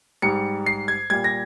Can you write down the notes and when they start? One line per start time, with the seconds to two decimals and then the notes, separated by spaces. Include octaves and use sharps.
0.22 G#2 G3 C#7
0.66 C7
0.88 G#6
1.10 A#2 G3 G#6
1.24 A#6